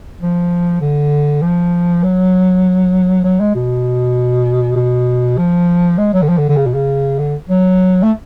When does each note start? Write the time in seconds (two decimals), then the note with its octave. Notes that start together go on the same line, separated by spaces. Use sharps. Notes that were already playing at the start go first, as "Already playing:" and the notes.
0.21 F3
0.81 D3
1.42 F3
2.04 F#3
3.24 F#3
3.40 G#3
3.55 B2
4.76 B2
5.38 F3
5.98 G#3
6.14 F#3
6.22 D3
6.29 F3
6.38 D3
6.49 D3
6.57 C#3
6.66 B2
6.74 C#3
7.19 D3
7.49 F#3
8.03 A3